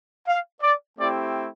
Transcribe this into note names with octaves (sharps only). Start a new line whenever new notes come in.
F5
D5
A3 C4 E4 G4 D5